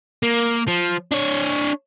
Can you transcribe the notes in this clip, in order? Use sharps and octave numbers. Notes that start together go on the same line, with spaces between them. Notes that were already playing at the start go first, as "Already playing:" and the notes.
A#3
F3
D4 C#5